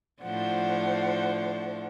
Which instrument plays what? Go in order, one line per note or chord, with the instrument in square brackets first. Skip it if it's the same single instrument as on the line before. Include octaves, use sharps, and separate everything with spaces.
[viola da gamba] A2 F3 D4 [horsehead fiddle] C5 F#5